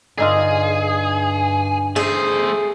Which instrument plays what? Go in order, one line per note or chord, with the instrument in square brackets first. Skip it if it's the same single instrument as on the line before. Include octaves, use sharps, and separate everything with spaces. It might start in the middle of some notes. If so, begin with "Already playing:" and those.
[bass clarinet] G2 [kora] D3 D#4 F4 [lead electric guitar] G#4
[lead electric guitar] A3 C5 [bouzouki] G#4